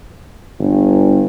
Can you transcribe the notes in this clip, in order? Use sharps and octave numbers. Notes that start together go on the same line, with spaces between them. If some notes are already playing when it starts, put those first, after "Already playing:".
G1